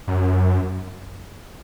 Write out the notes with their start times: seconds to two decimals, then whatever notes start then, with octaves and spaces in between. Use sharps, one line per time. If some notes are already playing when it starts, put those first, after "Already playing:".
0.08 F#2